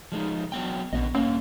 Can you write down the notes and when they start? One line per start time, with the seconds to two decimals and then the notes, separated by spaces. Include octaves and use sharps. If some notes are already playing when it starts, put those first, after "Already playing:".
0.12 F3 G#3 D#4
0.52 F#3 B3 G5
0.93 A#1 D3 B3 D#5
1.15 G2 A#3 C#4 F5